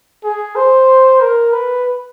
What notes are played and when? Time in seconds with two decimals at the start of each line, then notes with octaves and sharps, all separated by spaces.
0.24 G#4
0.56 C5
1.21 A#4
1.53 B4